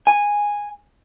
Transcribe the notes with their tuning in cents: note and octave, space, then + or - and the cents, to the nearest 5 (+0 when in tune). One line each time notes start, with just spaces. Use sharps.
G#5 -10